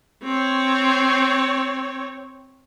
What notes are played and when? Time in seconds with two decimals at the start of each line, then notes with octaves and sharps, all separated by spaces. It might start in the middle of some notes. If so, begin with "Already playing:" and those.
0.23 C4 C#5